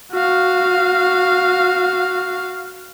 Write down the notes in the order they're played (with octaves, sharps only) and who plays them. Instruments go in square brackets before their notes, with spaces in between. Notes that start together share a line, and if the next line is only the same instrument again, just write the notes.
[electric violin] F#4 F5